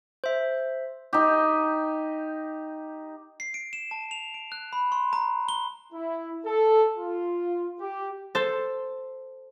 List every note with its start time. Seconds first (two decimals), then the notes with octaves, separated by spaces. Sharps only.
0.24 C5 E5
1.13 D#4 G4
3.40 C7
3.54 D7
3.73 E7
3.91 A5
4.11 F7
4.34 D7
4.52 F#6
4.73 B5
4.92 C6
5.13 A#5
5.49 G7
5.93 E4
6.45 A4
6.97 F4
7.80 G4
8.35 A4 C5